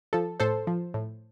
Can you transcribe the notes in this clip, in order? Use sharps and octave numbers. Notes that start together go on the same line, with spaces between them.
F3 A4
A2 A4 C5
F3
A2